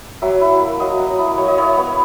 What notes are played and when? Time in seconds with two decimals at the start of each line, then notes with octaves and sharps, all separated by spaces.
0.22 F#3 E5
0.41 E4
0.61 A#3
0.80 F#3 D#5
0.99 F#3
1.19 E4
1.38 F#3 C#5
1.48 D#5
1.58 E4 C#5
1.77 B3